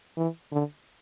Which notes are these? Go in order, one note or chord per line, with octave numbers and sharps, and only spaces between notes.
E3
D3